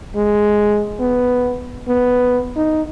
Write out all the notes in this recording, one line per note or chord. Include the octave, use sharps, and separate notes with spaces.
G#3
B3
B3
D#4